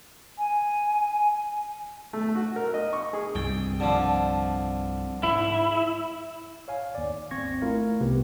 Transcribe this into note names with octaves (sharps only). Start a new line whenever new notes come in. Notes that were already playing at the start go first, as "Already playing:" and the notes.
G#5
A3
F#4
A#4
D#5
C#6
G#4
C2 G2 G5
D3 F3
G#2 E4
C#5 F5 G#5
D#2 D5
G#1 C4 C#6 G#6 A#6
A3 E4 F4 A#4 F5
C2 C3 B3 G4 B4